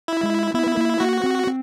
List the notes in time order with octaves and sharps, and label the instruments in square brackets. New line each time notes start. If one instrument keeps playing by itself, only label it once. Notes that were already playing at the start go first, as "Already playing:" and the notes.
[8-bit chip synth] E4
[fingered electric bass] G#3
[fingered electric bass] B3 [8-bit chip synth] E4
[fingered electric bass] B3
A#3
[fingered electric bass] A#3 [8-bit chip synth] F#4
[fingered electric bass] C4
C4